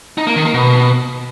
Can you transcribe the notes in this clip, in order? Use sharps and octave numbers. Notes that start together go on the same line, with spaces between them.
D#4
A#3
D#3
A#3
B2